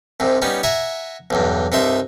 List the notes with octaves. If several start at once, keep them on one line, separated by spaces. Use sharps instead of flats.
C2 G#2 C3
G3 B3 C#4 D#4
E5 F#5 G#5 A#5
B1 E2 G2
C2 G2 D#4 E5 C6